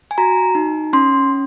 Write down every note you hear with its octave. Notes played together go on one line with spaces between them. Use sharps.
G#5
F#4 A#5
D#4
C#4 C6